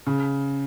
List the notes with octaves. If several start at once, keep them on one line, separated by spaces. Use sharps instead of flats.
C#3